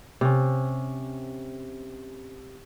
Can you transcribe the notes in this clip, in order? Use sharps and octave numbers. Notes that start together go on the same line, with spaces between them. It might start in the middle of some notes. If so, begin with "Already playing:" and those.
C3 C#4